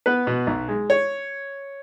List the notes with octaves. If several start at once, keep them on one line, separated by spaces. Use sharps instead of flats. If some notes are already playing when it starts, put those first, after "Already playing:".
B3 B4
B2
B1
G#3
C#5